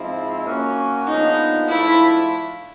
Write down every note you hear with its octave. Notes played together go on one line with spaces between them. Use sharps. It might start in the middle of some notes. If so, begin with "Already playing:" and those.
Already playing: G#2 F3 G#3 C4 E4
A#3 C#4 F#4
A#2 F3 G#3 B3 D4 D#4
G#2 F3 A3 D4 E4 F4